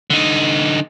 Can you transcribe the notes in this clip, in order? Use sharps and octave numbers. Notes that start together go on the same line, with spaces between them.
D3 D#4